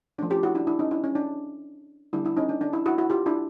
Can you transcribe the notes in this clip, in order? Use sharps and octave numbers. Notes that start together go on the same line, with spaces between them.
F3 A3 C#4 D4
F4 G4
E4 F#4
D4 E4
D4 E4
C#4 D#4
D4 E4
C#4
D4
D3 G3 B3 D4 E4
D4 E4
C#4 D#4
D4
D4
D4 E4
E4 F#4
E4 F#4
F4 G4
D4 E4